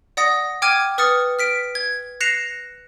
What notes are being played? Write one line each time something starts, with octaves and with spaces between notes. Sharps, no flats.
D5 F#5 D#6 A#6
G5 D6 F6 G#6 D#7
B4 D#6 F6 A6 C#7
F6 B6 D7
G#6
F#6 A#6 C7 C#7 E7 F7